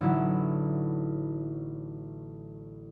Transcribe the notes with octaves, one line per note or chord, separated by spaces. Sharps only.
A1 A2 D3 F#3 D#4 E4